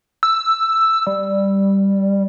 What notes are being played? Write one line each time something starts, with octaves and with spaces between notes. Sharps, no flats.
E6
G3